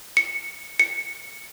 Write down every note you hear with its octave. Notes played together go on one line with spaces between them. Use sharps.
C#7
C#7